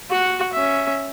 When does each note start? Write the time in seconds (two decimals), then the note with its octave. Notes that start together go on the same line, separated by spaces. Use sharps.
0.11 F#4 F#5
0.53 C#4 E5